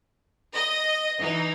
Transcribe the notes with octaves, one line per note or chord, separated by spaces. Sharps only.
D#5
E3 D#4